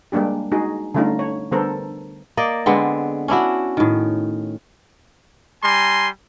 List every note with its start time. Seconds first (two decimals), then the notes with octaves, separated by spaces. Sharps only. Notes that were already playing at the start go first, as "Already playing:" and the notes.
0.12 G3 G#3 A#3 D4 G4
0.52 G#3 D#4 F#4 G#4
0.94 D3 G3 A3 C#4 D#4 F4
1.19 C#5
1.52 D3 G3 B3 A4 A#4 C5
2.37 A#3 D5 D#5
2.66 D3 G#3 B3 C4
3.28 C#4 D4 E4 F#4
3.77 A2 D#3
5.63 G3 G#5 A#5 C6